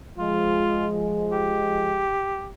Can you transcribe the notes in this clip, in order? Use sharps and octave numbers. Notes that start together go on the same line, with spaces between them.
F3 G#3 F4
G4